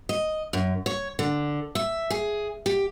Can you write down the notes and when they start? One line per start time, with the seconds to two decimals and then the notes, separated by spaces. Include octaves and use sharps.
0.09 D#5
0.53 F#2
0.86 C#5
1.19 D3
1.75 E5
2.10 G#4
2.66 G4